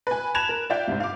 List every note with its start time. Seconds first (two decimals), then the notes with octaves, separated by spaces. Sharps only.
0.07 B4 G#5
0.34 A5 B5 F#6 G#6 E7 F7
0.49 A#4
0.70 D5 E5 F5 G5 G6
0.88 C2 G#2
1.00 F5 D6